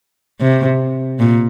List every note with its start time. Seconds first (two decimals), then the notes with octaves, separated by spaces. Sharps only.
0.40 C3
1.19 A#2